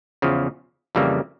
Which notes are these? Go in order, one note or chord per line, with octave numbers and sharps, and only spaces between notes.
E2 C#3 F3
F2 C#3 E3 G3 A#3